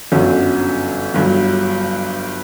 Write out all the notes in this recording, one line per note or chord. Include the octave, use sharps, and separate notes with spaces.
G1 F#2 D3 F#3 C#4
G1 G2 F#3